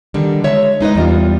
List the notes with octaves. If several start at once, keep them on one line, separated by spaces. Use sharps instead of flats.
D3 D#3 G3
G#3 C#5 E5
G#3 D#4 B4 D#5
E2 G3 F4